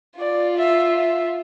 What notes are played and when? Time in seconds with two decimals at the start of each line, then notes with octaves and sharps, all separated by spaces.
0.20 F4 D5
0.58 E5
0.96 E5